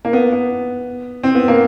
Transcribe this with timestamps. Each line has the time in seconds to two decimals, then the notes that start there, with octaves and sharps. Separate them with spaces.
0.05 A#3
0.13 B3
0.33 B3
1.23 C4
1.35 B3
1.48 A#3